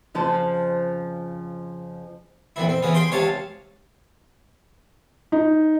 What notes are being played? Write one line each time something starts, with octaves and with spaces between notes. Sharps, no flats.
F2 C#3 F3 C5 A5
A#1 F2 E3 E4
C4
C#3 E3 B3 C#4
G#4 G5 C6
C#2 C3 C#5 F5 A5
D#4